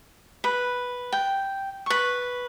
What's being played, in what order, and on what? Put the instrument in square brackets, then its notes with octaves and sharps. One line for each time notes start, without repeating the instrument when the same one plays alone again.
[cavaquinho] B4
G5
B4 C#6